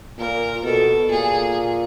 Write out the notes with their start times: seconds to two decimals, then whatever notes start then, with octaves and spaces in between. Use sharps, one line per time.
0.19 A#2 A#4
0.64 B2 A4
1.10 A#2 G#4